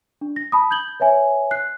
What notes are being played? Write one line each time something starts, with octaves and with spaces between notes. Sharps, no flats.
D4
A#6
A5 B5 D#6
G6 G#6 F#7 G7
B4 C#5 E5 G#5
F#6 C7